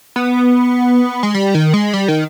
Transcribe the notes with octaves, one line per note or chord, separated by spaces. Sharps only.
B3
G#3
G3
D#3
G#3
G3
D#3